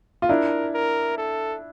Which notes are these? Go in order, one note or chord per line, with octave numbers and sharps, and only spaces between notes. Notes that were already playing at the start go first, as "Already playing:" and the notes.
F4
D4 E4 A#4
A#4
A4